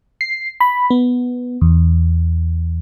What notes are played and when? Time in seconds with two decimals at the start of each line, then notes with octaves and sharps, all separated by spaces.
0.21 C7
0.60 B5
0.91 B3
1.61 E2